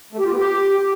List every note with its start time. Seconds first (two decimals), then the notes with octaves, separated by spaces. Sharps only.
0.13 A3
0.19 G4
0.25 F4
0.31 B3
0.37 G4